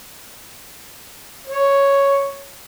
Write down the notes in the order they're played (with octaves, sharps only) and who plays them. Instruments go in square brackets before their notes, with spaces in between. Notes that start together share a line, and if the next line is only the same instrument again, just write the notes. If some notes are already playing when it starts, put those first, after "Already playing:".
[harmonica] C#5